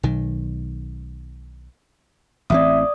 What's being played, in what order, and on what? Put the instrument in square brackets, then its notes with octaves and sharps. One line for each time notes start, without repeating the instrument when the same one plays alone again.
[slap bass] B1 D#3
[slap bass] A1 E3 C4 [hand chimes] D5 D#6 [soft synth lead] E5